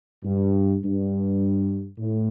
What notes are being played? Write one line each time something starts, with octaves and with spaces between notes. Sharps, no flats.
G2
G2
A2